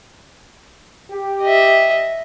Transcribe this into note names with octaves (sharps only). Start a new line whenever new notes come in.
G4
D#5 E5